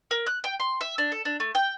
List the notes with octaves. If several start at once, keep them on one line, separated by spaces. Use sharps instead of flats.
A#4
F#6
G5
C6
E5
D4
A4
D4
A3
G5